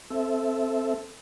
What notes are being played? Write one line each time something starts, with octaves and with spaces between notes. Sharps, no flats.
C4 A4 E5